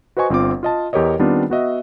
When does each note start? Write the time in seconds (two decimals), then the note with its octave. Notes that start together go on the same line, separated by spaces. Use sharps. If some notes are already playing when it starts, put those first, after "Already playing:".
0.17 F#4 B4 C5 D#5 G#5 C#6
0.30 G1 C4 F4 D6
0.63 F4 D#5 A5
0.93 E2 G4 A#4 C#5 D#5
1.19 D#3 G3 B3 C4 D4 F4
1.50 B3 F#4 D#5 E5